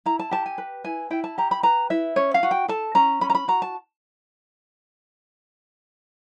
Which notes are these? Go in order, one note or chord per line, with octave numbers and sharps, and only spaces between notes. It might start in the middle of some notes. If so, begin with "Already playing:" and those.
E4 A#5
A5
G4 A5
G#5
B4
E4 G#5
E4 G5
A5
G4 A#5
B5
B4 A#5
E4 E5
C#4 C#5
F5
F#4
G5
A4 A5
C#4 A#5
C#4 B5
A#5
B5
F#4 A#5
A5